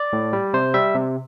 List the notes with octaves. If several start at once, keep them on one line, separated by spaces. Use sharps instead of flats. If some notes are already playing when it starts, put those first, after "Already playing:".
Already playing: D5
A2
G3
C3 C5
G3 E5
C3